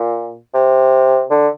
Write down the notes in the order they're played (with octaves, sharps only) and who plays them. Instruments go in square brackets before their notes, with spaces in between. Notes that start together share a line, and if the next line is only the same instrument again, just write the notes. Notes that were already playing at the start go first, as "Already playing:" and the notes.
Already playing: [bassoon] A#2
C3
D3